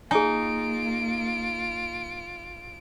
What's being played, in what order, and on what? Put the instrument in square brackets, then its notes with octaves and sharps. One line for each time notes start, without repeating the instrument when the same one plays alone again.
[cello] A#3 [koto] D#4 [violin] F4 D7 [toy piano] G#4 G#5